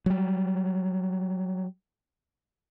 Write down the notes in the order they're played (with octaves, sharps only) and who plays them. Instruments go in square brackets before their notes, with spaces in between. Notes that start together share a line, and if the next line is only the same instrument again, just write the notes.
[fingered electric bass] F#3 G3